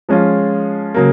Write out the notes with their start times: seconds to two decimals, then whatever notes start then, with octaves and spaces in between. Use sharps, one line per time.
0.09 F3 G#3 C#4 F4
0.94 C#3 F#3 A#3